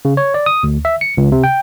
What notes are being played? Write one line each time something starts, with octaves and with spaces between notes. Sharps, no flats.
C#3
C#5
D5
D#6
D2
E5
C#7
C#2
C3
G5